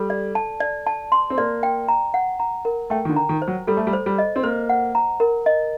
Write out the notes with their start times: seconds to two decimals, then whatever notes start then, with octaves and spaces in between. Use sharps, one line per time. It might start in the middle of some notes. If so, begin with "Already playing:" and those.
Already playing: G3 A4
0.10 D5
0.35 A5
0.60 D5
0.87 A5
1.12 C6
1.30 C4
1.37 A#3 D5
1.63 G5
1.88 A#5
2.14 F#5
2.40 A#5
2.65 A#4
2.90 A3 G5
3.05 D#3
3.09 D3
3.16 A#5
3.29 D#3
3.42 C5
3.48 F#3
3.67 G3 A4
3.77 A3
3.87 G3
3.93 C5
4.06 G3
4.18 D#5
4.36 C4
4.43 A#3 C5
4.69 F#5
4.95 A#5
5.20 A#4
5.46 D#5